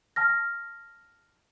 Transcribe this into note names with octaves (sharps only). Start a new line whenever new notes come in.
A5 F6 A#6